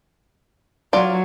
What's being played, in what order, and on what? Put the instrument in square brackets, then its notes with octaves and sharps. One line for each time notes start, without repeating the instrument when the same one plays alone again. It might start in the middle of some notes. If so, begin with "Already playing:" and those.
[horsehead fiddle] F#3 [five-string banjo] F4 D5